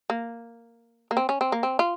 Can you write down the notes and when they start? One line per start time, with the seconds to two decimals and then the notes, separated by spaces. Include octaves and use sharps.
0.10 A#3
1.11 A#3
1.17 C4
1.29 C#4
1.41 C4
1.52 A#3
1.63 C4
1.79 F4